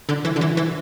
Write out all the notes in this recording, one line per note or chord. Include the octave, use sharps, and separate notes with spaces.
D3
E3
D3
E3
E3